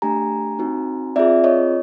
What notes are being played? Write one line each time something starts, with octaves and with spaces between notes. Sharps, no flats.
A3 D4 G4 G#5 A#5
C4 D#4 F#4
C4 F4 G#4 D5 E5
C#5 D#5